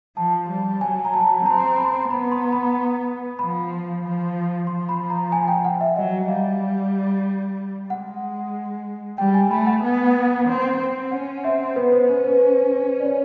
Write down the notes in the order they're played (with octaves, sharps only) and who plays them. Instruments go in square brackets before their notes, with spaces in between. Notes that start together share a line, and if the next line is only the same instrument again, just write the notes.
[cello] F3 [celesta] A5
[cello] G3
[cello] F#3 [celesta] G#5
[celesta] A#5
A5
A5
[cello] C4 [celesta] A#5
[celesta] B5
C6
[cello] B3 [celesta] B5
[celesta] C6
A#5
B5
[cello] F3 [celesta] B5
[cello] F3
[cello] F3 [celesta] C6
[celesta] B5
A#5
G#5
G5
F#5
E5
[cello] F#3 [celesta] D#5
[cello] G3 [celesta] F5
[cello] G#3 [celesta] F#5
[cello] G3 [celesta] G5
[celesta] G#5
[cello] A3 [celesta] B5
[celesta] F#5
[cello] B3
C4
C4
[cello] C#4 [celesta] F#5
[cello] C4 [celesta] E5
[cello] B3 [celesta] B4
[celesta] C5
[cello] C#4 [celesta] C5
[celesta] B4
C5
C5
D5
C#5